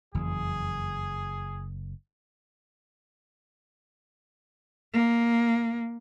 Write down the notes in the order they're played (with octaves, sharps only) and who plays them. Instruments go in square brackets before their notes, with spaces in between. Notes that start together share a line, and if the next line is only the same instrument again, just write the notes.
[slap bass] F#1 [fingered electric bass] F2 E3 [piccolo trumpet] G#4
[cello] A#3